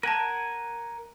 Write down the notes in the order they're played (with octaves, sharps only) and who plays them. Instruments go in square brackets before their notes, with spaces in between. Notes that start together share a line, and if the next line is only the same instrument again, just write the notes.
[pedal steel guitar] A#4 F#5 G#5 [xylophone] A5 D#7